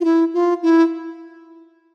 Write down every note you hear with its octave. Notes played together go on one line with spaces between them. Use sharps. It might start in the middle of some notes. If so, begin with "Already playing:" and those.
F4
E4
F4
E4